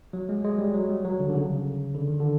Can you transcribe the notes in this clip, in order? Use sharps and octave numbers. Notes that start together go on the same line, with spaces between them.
F#3
G#3
G#3
G3
F#3
G3
F#3
D3
D3
C#3
D3
D#3
D3